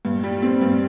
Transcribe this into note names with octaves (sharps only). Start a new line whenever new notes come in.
G2
G3
C4
G2